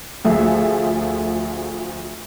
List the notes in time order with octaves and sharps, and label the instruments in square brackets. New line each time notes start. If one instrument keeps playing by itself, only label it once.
[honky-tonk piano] D2 F3 A3 G#4 E5